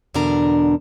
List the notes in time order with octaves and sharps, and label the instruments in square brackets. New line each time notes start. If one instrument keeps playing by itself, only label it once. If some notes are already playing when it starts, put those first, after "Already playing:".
[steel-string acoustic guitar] E2 B2 D3 D4 A#4 A#5